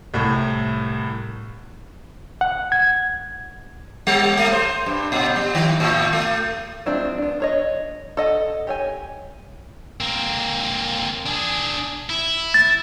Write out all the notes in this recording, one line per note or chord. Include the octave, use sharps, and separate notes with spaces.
C2 A2
F#5
G#6
G3
A3
C5
G2
A#2
G3
D#3
A2
A3
F3 G#3 C4 D4 E4
B3 D4
D4 C#5 D#5
A4 D#5 F#5
G4 C#5 G#5
A#3 C4
D4 G#4
E4
A6